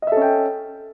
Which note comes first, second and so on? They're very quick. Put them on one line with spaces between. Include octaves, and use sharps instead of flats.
D#5 E5 A4 C#4 G5